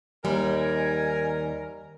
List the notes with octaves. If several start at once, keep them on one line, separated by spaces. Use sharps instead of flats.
D#2 G3 D#4 A#4 G#5